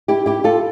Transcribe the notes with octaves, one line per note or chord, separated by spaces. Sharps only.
E4 G4
E4 G4
F4 A4